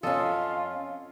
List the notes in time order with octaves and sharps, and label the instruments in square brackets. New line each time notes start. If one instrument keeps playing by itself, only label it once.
[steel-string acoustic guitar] F2 C#4 [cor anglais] F4 [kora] A4 D#5 [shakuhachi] F5